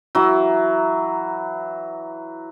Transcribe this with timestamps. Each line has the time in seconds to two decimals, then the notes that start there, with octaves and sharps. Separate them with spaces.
0.15 E3 F#3